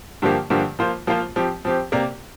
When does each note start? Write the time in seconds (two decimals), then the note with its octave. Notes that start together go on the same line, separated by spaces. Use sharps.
0.22 G2 D3 F3 A#3 G4
0.50 G2 D3 F3 A#3 G4
0.79 F3 A#3 F4 C5
1.07 F3 A#3 F4 C5
1.36 F3 C4 G4
1.65 F3 C4 G4
1.92 C3 A#3 G4 A#4 D5